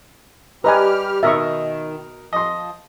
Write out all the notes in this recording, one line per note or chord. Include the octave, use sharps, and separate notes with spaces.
G3 G4 B4 D#5 G#5 A#5 F6
B2 D#3 A#4 D#5 E5 C#6
F3 D#5 C6